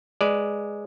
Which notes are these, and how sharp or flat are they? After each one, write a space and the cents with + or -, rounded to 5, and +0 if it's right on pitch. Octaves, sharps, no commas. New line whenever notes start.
G#3 +0 B4 +0 D5 +0